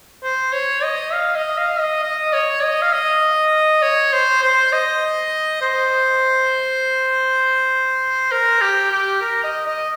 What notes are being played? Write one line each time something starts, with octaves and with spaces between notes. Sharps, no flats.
C5
C#5
D#5
F5
D#5
F5
D#5
D#5
C#5
D#5
F5
D#5
C#5
C5
C5
D#5
C5
A#4
G4
G4
A#4
D#5
D#5